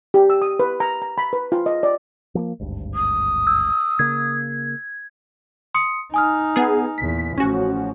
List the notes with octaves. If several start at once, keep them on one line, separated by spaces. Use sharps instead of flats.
G4
E6
D#6
B4
A#5
A#5
B5
B4
F4
D#5
D5
F3 A3 A#3
G#1 D2 G2
D#6
E6
C#3 A#3 G#6
C6 D#6 C#7
D#4 G#5 D#6 F6
B3 G#4
E2 A#2 B6
A1 F3 C#4 F#4